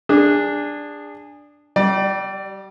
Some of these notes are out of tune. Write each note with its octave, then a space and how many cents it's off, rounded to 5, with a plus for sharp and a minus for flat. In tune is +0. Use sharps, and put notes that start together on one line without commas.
D4 +0 G#4 -25
G3 -30 D5 +20